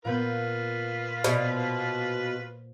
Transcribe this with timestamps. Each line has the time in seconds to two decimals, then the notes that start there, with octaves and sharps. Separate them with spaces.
0.05 A#2 B3 F4 B4 G6
1.24 B2 C5